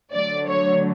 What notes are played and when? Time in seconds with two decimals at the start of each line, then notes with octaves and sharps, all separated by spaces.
0.13 D3 F#3 A3 D5
0.46 C#5